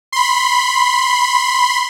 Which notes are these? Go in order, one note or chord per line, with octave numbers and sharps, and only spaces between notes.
B5 C6